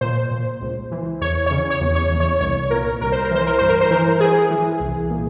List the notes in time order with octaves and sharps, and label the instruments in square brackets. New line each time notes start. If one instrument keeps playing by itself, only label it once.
[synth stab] A#2 C5
A#2
C#2
E3
E2 C#5
C#3 C#5
C#5
E2
C#5
E2
C#5
C2 C#5
A#2 A#4
C2 A#4
C5
A#4
E3 C5
A#4
G2 C5
A#4
C5
E3 A#4
E3 G#4
E3
C2
A#2